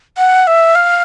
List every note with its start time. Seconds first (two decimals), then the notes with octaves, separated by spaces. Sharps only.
0.17 F#5
0.47 E5
0.75 F5